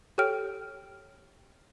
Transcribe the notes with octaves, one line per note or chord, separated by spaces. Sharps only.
G4 A4 C#5 G5 F6 D7